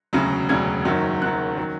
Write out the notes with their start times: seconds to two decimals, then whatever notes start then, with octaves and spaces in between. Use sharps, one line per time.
0.13 E1 D2 C#3 F#3
0.49 E1 D2 C#3 F#3 G#6
0.85 F#1 F#2 D#3 F#3
1.21 F#1 F#2 D#3 F#3 F#6
1.58 D#3 F#3